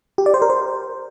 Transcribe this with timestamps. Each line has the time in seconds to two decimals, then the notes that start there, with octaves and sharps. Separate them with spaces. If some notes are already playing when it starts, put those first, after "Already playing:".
0.18 G4
0.26 D5
0.34 C5
0.42 A#4
0.50 C5